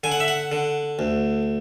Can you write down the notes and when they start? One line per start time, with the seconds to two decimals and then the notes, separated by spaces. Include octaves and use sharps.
0.04 D3 G#5
0.12 F#5
0.20 E5
0.28 F#5
0.52 D3
0.99 D2